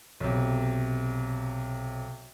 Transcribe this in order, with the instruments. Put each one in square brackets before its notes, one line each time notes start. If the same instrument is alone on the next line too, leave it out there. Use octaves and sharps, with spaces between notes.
[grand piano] B1 C3